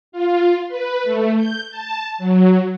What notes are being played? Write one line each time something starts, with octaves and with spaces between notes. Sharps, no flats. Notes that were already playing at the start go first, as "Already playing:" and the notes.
F4
B4
A3
G6
A5
F#3